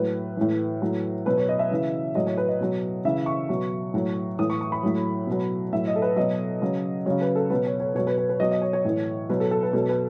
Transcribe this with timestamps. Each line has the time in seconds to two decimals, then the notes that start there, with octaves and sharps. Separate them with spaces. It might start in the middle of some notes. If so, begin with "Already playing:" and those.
Already playing: A2 F#3 B4
0.37 A2 E3
0.82 A2 F#3
1.26 B2 F#3 B4
1.37 C#5
1.49 D#5
1.59 E5
1.71 C#3 E3
2.15 A2 F#3 D#5
2.26 C#5
2.38 B4
2.48 D#5
2.60 B2 F#3
3.05 C#3 E3 E5
3.26 C#6
3.49 B2 F#3
3.94 A2 F#3
4.39 A2 E3 D#6
4.50 C#6
4.61 C#6
4.72 B5
4.83 A2 F#3
5.27 B2 F#3
5.73 A2 F#3 E5
5.87 D#5
5.96 A4
6.02 B4
6.16 B2 F#3 D#5
6.61 C#3 F#3
7.06 C#3 F#3 C#5
7.21 B4
7.36 A4
7.50 B2 F#3 B4
7.66 C#5
7.80 C#5
7.95 B2 F#3 C#5
8.07 B4
8.18 B4
8.29 B4
8.40 B2 F#3 D#5
8.51 D#5
8.62 C#5
8.73 C#5
8.85 A2 E3
9.29 B2 F#3 B4
9.40 A4
9.51 A4
9.63 B4
9.73 B2 F#3 A4
9.89 B4